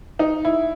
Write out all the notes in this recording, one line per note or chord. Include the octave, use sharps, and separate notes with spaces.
D#4
E4